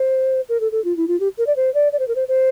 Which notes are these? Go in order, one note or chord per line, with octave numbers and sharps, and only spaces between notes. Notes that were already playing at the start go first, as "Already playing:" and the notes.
Already playing: C5
A#4
A4
A4
F4
E4
F4
G4
A#4
D5
C5
D5
D5
C5
A#4
C5
C5